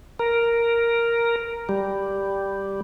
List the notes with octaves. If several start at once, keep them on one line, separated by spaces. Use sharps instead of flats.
A#4
G3